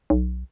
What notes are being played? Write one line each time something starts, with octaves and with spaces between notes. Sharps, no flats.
B1